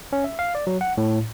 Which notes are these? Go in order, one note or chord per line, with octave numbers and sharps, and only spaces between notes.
C#4
E5
F5
D5
F#3
F#5
A2